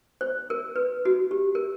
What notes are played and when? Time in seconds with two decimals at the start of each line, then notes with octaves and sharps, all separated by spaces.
0.21 C5
0.50 A#4
0.76 B4
1.05 F#4
1.31 G4
1.55 A#4